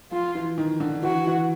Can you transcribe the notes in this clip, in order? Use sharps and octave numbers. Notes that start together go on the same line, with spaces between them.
F3 F4
E3
D#3
D3
E3 F#4
E3